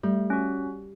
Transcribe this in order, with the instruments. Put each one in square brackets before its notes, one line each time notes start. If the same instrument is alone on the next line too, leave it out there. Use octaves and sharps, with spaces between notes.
[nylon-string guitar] G3 [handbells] A3
[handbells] C#4 F#4